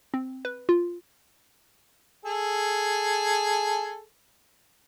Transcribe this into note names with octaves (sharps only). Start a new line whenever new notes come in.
C4
B4
F4
G#4 A4